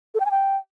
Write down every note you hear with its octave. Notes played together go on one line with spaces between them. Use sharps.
A4
G5
G#5
G5